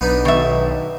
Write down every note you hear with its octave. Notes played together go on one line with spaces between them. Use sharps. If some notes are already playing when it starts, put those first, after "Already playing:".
B1 B3 D4 D#4
D#3 E5